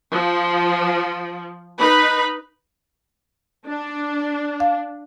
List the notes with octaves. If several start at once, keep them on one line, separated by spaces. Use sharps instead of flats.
F3
D#4 B4 B5
D4
F5